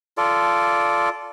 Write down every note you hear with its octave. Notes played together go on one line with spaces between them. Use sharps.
F4 A4 D5